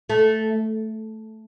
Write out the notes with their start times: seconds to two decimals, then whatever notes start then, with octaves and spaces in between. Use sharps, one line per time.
0.10 A3